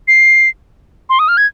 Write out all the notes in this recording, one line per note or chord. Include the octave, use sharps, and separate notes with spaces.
C7
C6
D#6
F6
G#6